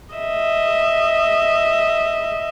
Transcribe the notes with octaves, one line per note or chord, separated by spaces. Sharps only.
D#5 E5